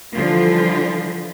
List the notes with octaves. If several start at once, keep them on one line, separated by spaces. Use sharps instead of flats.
D3 E3 F3 G3 F4